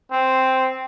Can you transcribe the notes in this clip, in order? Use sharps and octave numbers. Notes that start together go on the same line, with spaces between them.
C4